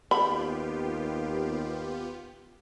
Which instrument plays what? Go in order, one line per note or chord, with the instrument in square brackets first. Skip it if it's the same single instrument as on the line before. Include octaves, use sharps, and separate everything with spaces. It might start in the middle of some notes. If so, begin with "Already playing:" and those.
[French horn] D#2 [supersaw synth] B3 F4 G4 [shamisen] B5